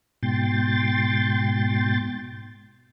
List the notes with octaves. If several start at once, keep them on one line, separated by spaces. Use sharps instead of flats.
G#2 B2 G5 C6 A6